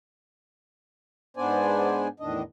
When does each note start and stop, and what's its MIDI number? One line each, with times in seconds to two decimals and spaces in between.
1.37 2.08 44
1.37 2.08 59
1.37 2.08 62
1.37 2.08 72
1.37 2.08 74
1.37 2.08 80
2.20 2.42 40
2.20 2.42 45
2.20 2.42 51
2.20 2.42 62
2.20 2.42 75